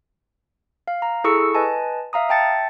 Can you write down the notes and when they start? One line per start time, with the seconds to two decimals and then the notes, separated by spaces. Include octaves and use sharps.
0.88 F5
1.02 A#5
1.24 E4 G#4 A4 C#6 E6 C#7
1.54 B4 D#5 G#5 A5
2.13 E5 F5 A#5 D#6
2.29 E5 G5 A5 A6 C#7